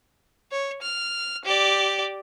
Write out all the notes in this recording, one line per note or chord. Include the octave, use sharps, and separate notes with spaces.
C#5
F6
G4 D5